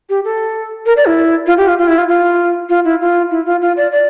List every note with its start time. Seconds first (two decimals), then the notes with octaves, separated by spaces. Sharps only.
0.10 G4
0.25 A4
0.86 A#4
0.97 D5
1.06 E4
1.47 F4
1.58 G4
1.68 F4
1.79 F4
1.88 E4
1.98 F4
2.08 F4
2.69 F4
2.85 E4
3.01 F4
3.31 E4
3.46 F4
3.62 F4
3.77 D5
3.92 D5